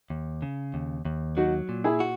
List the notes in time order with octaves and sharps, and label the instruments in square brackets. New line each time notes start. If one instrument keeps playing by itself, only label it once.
[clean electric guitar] D#2
C#3
D#2
D#2
[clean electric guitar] F#3 [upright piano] D#4 F#4
[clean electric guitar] A#2
[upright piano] E4 G#4
[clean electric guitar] F#4